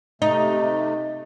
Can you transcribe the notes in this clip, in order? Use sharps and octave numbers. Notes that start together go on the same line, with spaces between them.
C3 A3 D#4 D#5